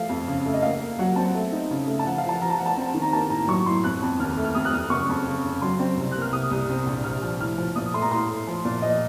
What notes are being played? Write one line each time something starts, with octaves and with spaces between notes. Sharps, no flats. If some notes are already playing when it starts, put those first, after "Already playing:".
Already playing: F3 A3 F5
F2
C#3
A3
D#5
A#3 F5
A#3
F#3 F#5
C4 A5
A3
D#4
C#3
A3
A5
F3 F#5
F5
F3
A5
F3 A#5
A5
F3 F#5
A5
C4
D#3
A#5
A#3 A5
A2 A#5
F#3 C#6
A2 C6
F2 F#6
F2
D#2 F6
A3
F6
F2 D#6
F#6
F2 F6
F#1 C#6
F2
C#3
C#3
F#3 C6
C4
C2
A#3 F#6
F6
C3 D#6
C2
C4
A#1
C3 F6
F3
A2 F6
F3
A#2 D#6
A3 C6
A#5
A2 C6
A3
F3
A#2
F3 D#5